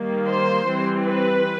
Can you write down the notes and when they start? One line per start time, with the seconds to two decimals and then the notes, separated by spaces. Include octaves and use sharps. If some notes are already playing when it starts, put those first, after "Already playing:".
Already playing: D#3 G3 A#3
0.28 C5
0.67 E3 G3 C4
1.06 B4